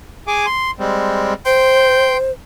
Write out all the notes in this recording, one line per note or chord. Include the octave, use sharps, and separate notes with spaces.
G#4 G#5 D6
C6
G3 G#3 C4
C5 G5 C6 G6